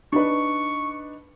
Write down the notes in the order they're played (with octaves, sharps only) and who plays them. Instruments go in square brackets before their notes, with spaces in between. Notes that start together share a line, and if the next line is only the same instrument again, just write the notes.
[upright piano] D4 D#4 B4 [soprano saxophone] C#6